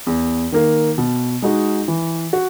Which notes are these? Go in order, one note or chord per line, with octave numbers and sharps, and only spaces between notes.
E2
D#3 A#3
B2
G#3 D#4 F#4
E3
F#4